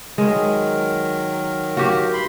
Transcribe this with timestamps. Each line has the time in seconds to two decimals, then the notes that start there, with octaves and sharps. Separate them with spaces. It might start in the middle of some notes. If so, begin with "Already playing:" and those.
0.18 D#3 F#3 G#3 A#4
1.77 F#4 G4
2.13 G2 B5 C6